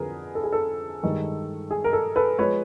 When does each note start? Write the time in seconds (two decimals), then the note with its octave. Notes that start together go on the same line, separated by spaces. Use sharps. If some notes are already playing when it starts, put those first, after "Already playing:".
Already playing: F2 D3 F#3 G#4 A#4 B4
0.35 A4
0.43 G#4
0.52 A4
1.03 G2 D#3 G#3
1.71 G#4
1.84 A#4
1.93 A4
2.16 A4 B4
2.39 F3 G#3 B4 C#5